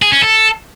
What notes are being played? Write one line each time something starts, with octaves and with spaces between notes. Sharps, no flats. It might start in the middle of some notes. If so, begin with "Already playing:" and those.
G#4
C#4
A4